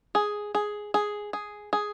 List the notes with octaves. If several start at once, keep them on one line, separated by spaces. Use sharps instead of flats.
G#4
G#4
G#4
G#4
G#4